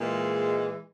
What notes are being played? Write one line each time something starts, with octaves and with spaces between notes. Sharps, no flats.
A#2 E3 G#3